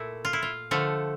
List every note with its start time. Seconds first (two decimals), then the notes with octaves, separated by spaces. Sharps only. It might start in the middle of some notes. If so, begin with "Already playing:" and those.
Already playing: A#2 A3 E4
0.25 F4
0.33 E4
0.42 F4
0.71 D3 F3 A3